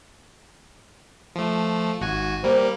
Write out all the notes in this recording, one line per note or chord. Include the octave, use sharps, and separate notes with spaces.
F3 A3
G#1 F#4 G#5
G3 A#3 C5